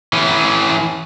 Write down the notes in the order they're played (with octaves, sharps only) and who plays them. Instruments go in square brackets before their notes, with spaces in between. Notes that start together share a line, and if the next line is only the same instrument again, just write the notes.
[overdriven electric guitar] E3 C#4